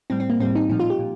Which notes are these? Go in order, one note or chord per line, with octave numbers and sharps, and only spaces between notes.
A2 G3 C4
C4
A#3
A2 G3 C4
D#4
A#2 F3 D#4
F4
G4
A#2